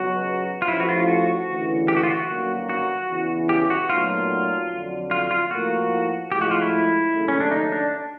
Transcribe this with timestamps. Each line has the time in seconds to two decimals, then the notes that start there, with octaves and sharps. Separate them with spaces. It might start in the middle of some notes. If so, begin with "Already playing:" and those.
Already playing: C#2 B2 F#3 F#4
0.62 F4
0.68 A1 A2 F3 E4
0.80 F#4
0.89 F4
1.08 F#4
1.48 D2 C#3 E3
1.88 G4
1.96 F#4
2.03 F4
2.10 F#4
2.29 G1 F#2 D#3 F#3 A#3
2.69 F#4
3.09 E2 C#3 E3
3.49 G4
3.70 F#4
3.89 B1 A#2 F#3 A3 F4
4.10 F4
4.71 F2 D3 F#3
5.11 F4
5.31 F4
5.51 A2 F3 A#3 F#4
6.32 A2 F3 G#3 G4
6.41 F#4
6.51 F4
6.62 E4
7.12 D#2 C#3 F#3 A3
7.28 C#4
7.40 D4
7.52 D#4
7.72 D4